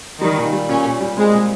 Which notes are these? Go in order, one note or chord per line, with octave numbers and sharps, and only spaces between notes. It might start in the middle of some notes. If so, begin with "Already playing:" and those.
D#3 G3
A#2
G3
A#2 C#4
A#2
G3
G#3 C4
A#2